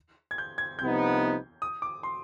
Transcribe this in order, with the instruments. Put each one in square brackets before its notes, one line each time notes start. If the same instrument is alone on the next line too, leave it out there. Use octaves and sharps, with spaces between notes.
[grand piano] G#6
G6
G#6
[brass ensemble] C2 C3 F3 B3 D#4 [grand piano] G6
[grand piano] D#6
D6
C6